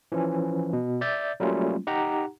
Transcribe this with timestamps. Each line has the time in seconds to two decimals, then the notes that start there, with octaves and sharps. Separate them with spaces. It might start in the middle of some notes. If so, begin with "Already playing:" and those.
0.12 E3 F3 C#4
0.73 B2
1.01 D5 E5 G6 A6
1.40 F#3 G3 A3 A#3 C#4 F4
1.87 D#4 G4 F#5 A#5